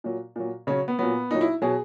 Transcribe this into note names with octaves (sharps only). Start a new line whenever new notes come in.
A#2 F#3
A#2 F#3
C#3 F#3 C#4
B3
A#2 F#3 B3
A#2 F#3 D#4
E4
B2 F#3 G#4